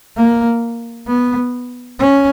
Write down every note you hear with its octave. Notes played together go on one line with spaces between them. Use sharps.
A#3
B3
C#4